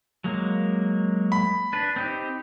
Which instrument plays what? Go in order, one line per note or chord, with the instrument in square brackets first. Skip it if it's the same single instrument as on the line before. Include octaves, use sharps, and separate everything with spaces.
[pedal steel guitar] F#3 G#3 A#3
[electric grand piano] B5
[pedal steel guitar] D4 B4
C4 D#4 G4